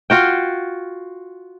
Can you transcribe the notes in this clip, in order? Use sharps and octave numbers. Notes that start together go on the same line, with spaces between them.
F4 F#4 G5